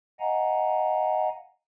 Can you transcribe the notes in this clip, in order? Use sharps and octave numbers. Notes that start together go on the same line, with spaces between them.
D#5 F5 F#5 G#5 A#5